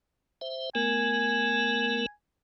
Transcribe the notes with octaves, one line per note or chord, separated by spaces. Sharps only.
C5 E5
A3 B3 A#4 G#5